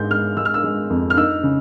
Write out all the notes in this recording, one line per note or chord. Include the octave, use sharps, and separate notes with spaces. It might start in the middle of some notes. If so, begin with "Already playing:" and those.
Already playing: G#2 G#3 G6
G#3 F6
G#3 E6
F6
E6
G#3
F2
F6
D#4 E6
C#3